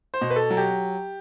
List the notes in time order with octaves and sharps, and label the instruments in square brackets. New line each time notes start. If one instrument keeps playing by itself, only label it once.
[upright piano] C5
B2
B4
A4
F#3
G4